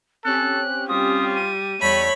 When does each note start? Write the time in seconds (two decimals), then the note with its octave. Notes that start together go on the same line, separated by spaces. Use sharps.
0.25 C4 C#4 G4 A4 F#6
0.89 G3 F4 D#6
1.35 D#7
1.81 E2 G3 A3 C#5 B5